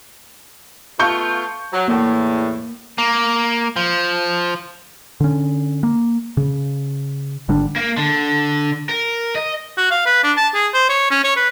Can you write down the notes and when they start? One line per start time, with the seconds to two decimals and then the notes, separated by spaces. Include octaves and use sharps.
0.99 A3 B3 F4 A5 C#6 G6 C#7
1.73 F#3 A#5
1.88 E2 A2 A#3
2.98 A#3
3.76 F3
5.20 D3 C#4
5.83 A#3
6.37 C#3
7.48 G#1 D3 G3 D4
7.76 A#3
7.97 D3
8.89 A#4
9.36 D#5
9.77 F#4
9.91 F5
10.06 B4
10.24 D4
10.37 A5
10.54 G#4
10.74 C5
10.89 C#5
11.11 C#4
11.24 C#5
11.36 B4